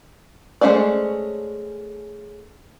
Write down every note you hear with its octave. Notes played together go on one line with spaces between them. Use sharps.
G#3 A3 C#4 C5 D5